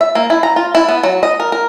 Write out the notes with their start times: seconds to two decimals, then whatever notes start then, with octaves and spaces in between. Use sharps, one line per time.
0.01 E5
0.15 A#3
0.30 E4
0.43 A#5
0.56 F4
0.75 E4
0.89 B3
1.03 F#3
1.23 D#5
1.40 A#4
1.52 A#4